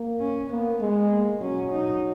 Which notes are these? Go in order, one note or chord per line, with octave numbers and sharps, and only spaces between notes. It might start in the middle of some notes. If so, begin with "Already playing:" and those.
Already playing: A#3
C#4
A#3 B3
G#3
A#3
F#3 C#4
D#4